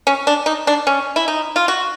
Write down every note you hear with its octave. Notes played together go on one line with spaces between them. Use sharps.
C#4
D4
D#4
D4
C#4
E4
D#4
F4
F#4